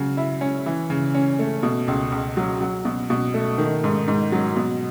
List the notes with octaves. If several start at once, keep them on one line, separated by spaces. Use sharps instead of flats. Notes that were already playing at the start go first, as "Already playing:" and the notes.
Already playing: C#3 F#3
E4
C#4
E3
C#3
C#4
A3
B2
C#2
C#2
F#3
F#3
B2
B2
A3
D#3
G#2
G#2
F#3
B2